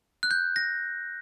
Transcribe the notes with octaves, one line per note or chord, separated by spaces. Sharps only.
F#6
G6
A#6